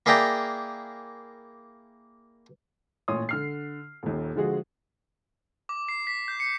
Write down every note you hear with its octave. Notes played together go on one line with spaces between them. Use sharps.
A#3 E4 G#4 D5 G5 A#5
A1 A#2 C#5 C6 D#6
D3 F6 C7
D#1 D#2
D3 F3 G#3 F#4 G#4
D6
C7
B6
G6
C#7